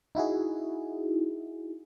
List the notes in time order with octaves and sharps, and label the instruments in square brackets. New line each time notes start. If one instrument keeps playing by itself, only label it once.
[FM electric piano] D#4 E4 F#4 G#4